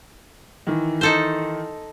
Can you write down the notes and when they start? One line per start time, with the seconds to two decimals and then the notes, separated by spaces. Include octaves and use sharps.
0.67 D#3 E3
1.01 D#4 A4 C5